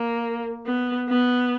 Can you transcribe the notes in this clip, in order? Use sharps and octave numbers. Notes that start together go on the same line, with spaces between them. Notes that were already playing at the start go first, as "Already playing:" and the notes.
Already playing: A#3
B3
B3